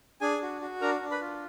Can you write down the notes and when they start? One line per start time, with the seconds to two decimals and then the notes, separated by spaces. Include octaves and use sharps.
0.21 D4 G#4 G#5
0.42 F#4
0.61 F#4
0.81 D4 A#4 A#5
1.01 D4
1.11 B4 B5
1.21 F4